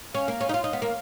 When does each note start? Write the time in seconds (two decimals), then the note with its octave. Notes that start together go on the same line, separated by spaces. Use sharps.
0.15 C#4 F5
0.28 A#3
0.41 C#4
0.49 D#4
0.54 F4
0.64 D#4
0.73 B3
0.82 A#3